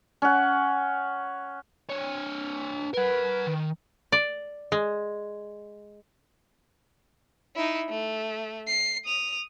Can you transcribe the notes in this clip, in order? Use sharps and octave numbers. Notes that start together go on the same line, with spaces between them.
C#4 F#5
D4 C#5
A#4 B4 F#5
D#3
D5
G#3
D#4 E4
A3
C7
D#6 F7